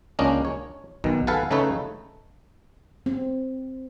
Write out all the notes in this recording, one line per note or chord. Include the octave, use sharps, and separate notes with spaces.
C#2 A#3 C#4 D4 D#5
C#5
B1 B2 D#3
A4 B4 F5 F#5 G#5 A5
C#3 A3 D#4 A4 B4 C#5
C4